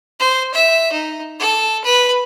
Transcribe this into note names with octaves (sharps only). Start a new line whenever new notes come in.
C5
E5
D#4
A4
B4